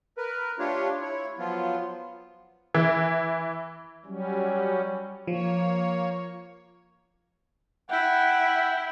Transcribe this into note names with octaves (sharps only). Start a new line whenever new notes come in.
A#4 B4
A3 D4 F4 G4 C#5
E4 C#5
F3 F#3 B3 F4
E3
F#3 G3 C#4
F3 A#3 C#5
E4 F#5 G5